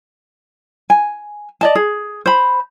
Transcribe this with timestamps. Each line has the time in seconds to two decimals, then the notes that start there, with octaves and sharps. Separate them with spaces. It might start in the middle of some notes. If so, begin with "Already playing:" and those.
0.90 G#5
1.61 D5 D#5 A5
1.75 G#4
2.26 C5 B5